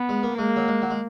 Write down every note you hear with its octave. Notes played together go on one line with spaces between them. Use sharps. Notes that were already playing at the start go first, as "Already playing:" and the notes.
Already playing: B3
G#3
A#3
G#3 A#3
F#3
G#3
F#3
G#3